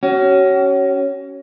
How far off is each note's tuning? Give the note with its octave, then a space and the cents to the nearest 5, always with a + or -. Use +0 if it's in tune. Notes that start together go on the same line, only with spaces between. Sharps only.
C#4 +0 F#4 +35